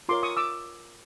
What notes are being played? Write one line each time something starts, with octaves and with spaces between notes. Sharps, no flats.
F4 A#4 C#5 C6 D6
C#6 D#6
D6 E6